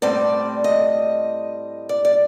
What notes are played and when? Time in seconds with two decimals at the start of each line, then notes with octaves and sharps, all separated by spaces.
0.02 A2 G3 C4 D5
0.64 D#5
1.89 D5
2.05 D5